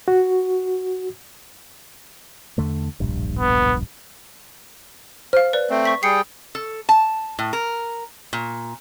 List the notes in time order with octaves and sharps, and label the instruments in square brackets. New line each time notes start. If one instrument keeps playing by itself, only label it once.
[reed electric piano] F#4
[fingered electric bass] E2 D3 A3
D1 A#1 G2
[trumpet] B3
[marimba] C5 [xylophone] F5 F6
[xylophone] B4 D5
[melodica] A3 C4
[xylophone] C#6 B6
[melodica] G3 G#4 G5 [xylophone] C7 C#7
[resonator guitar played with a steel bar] A4
A5
A2
A#4
A#2